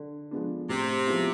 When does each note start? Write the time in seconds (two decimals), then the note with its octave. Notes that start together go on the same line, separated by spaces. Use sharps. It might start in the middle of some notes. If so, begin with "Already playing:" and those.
Already playing: D3
0.31 F3 G#3 B3 D4
0.69 A2 C3
1.07 F3 G#3 B3 E4